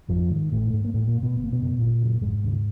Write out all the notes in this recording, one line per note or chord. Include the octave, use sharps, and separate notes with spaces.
G#1 F2 F3
G#2 D#3
A1 A2 A3
G#2
A#3
A1 A2 A3
A#2 A#3
G#2
B2 B3
G1 B3
A#3
B2 B3
F#2 C#3
G1 A#2 A#3
F#2 C#3
F1 G#2 G#3
D#2 C#3